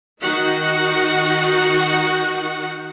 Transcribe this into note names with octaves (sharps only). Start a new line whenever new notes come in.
D#3 D#4 F#4 F#5